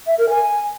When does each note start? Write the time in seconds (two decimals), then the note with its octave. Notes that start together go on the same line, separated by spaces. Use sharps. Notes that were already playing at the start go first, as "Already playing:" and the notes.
0.07 E5
0.18 A#4
0.30 G#5